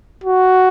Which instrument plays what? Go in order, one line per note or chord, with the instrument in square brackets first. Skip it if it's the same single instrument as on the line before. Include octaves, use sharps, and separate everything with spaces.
[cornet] F#4